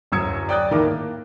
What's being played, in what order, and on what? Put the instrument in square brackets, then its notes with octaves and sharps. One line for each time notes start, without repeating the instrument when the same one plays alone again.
[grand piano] D1 F#2 D#6 E6 G#6 C#7
D5 G5 D#6 F#6 A6
A2 D#3 A3 A#3 A#4 D6
A#3